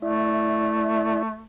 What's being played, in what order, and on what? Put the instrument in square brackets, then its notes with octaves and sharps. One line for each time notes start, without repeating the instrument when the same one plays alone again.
[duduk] A3 [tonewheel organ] E4 D5 E5